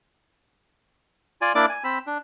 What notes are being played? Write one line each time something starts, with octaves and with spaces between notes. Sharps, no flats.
F4 D5 G#5
A#3 D4 E4 D5 D6
G#5
C4 B5 E6
D4